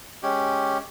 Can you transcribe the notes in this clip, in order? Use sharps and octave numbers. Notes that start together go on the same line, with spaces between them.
G#3 C#4 G4